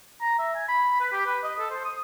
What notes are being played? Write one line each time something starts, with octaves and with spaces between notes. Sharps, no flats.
A#5
E5
G#5
B5
B4
G4
B4
D#5
A4
C5
D#6